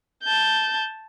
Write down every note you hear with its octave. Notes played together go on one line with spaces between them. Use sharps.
A5 G6